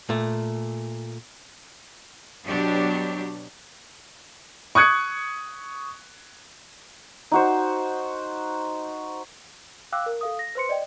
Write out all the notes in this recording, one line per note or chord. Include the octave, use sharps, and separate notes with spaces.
A#2 A3
B2 F#3 D4 G4
C#6 D#6 F#6 G#6 C#7
D#4 F#4 C5
F5 G5 D6 E6 F#6
A#4
A4 F5 D#6
A#6
B4 C5 C6 C#7
D5 D#5 G5